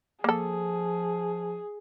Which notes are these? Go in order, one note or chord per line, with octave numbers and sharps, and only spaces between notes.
F3 A#3 G#4 A4